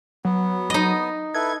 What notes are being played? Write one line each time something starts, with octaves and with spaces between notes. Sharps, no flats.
F#3 B3
D#4 D#5
E4 A4 B4 G#6